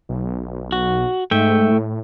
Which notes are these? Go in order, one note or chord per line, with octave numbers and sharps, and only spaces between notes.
B1
F#4
G#2 A3 E5 G5
A2